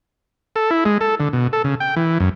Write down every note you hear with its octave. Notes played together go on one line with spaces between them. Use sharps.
A4
E4
G#3
A4
D3
B2
A4
C#3
G5
E3
F#2